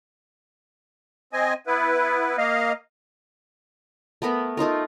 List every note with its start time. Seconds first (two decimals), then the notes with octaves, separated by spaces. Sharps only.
1.33 C4 D#5 G#5
1.67 B3 E4 B4
2.38 A#3 D#5 F5
4.22 A3 B3 A#4 B5
4.57 A3 D#4 F4 A#4